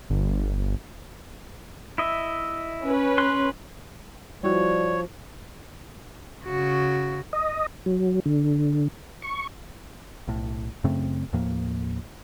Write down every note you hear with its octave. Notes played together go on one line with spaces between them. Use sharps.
G1
E4 D#5 E5
C#4 B4
C6 F#6
F3 G3 E4 F#4 C#5 D5
C#3 F#4
D#5
F#3
D3
C#6
B1 A2
F#2 C#3 A3 C4
D#2 A2 F3 A#3